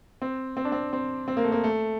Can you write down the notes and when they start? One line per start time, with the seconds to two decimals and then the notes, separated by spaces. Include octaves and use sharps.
0.22 C4
0.57 C4
0.65 D4
0.72 C4
0.93 C4
1.28 C4
1.37 A#3
1.44 A3
1.52 A#3
1.64 A3